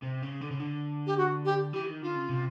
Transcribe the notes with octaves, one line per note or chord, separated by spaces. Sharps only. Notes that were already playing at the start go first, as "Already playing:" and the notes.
C3
C#3
D3
C#3
D3
G4
F#4
G4
E3 G4
D#3
D3 F4
C#3
C3